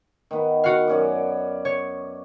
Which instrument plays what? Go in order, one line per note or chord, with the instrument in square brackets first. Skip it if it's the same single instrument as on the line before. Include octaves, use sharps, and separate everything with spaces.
[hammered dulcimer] D#3 B3
[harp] F#4 F5
[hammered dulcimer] F#2 C#4 D5
[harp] C#5